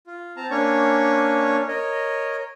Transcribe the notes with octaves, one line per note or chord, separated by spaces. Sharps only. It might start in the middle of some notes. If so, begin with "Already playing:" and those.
F4
C4 A5 A#5
A#3 C#4 D4 C#5 C#6
A#4 C#5 D#5